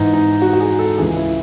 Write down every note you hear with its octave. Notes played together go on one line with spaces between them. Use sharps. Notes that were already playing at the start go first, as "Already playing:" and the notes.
Already playing: G#2 E3 D#4
D#4
F#4
F#4
G#4
A4
C#2 C#3 E3 G#4
E4